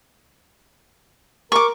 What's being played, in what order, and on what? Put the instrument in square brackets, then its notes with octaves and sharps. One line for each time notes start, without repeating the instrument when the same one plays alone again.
[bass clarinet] A#4 [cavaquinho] C#6 D6